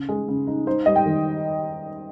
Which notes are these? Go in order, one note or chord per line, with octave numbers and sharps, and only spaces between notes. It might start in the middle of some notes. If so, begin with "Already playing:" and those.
Already playing: C#3
G#3
C#3
D#4
D#4 C5
G3 D#5
G5
D#3